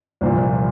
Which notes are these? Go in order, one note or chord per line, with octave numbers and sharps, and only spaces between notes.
C2 A#2 F3 C5